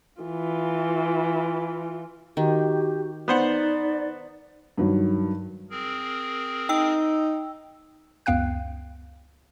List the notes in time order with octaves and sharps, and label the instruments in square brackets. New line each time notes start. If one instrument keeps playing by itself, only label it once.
[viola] E3 F4
[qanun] D#3 [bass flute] F#4 [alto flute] G4
[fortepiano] B3 C5 F#5 [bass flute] D#4 [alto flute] D5
[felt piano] G2 D#3 F#3
[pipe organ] C4 G#4 A#4
[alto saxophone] D#4 [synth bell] G5 E6
[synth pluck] C#2 F#2 B3 F5 G5 F#6